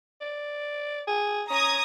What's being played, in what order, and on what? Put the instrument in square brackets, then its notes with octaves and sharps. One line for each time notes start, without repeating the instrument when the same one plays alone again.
[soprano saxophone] D5
G#4
[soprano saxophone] C#4 [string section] A#5 D#6 G#6